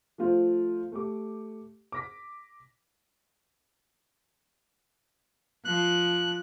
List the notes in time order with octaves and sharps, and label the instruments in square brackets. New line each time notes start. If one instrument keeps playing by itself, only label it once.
[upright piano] F3 A3 F4 C5 F5
A3 G4 D6
D6 A#6 B6
[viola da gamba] F3 [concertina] F#6